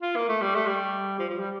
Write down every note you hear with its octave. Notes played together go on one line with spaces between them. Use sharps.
F4
A#3
A3
G3
A3
G3
F3
F3
G3